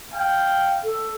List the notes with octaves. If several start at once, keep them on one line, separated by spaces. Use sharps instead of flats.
F5 G5
A4